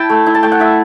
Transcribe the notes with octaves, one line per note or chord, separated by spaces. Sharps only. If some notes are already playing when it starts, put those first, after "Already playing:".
Already playing: E4 G5 A5
A3
E4
A5
A3 G5
F#5
E4 E5